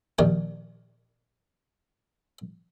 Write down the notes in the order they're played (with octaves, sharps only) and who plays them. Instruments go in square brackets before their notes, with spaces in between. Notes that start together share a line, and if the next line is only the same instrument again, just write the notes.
[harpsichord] A#1 D#3 D4 G4